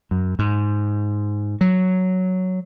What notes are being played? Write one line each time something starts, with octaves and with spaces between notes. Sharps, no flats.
F#2
G#2
F#3